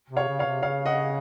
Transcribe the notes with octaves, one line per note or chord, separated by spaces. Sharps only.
C3
C#5 F5
C#3
C#5 F5
C3
C#3 C#5 F5
D#5 F#5